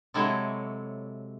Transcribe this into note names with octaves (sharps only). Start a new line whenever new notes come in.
C3 F#3 G#3 E4 A4 C#5